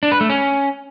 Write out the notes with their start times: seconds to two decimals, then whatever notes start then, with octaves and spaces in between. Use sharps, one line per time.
0.03 D4
0.12 B4
0.21 A3
0.30 C#4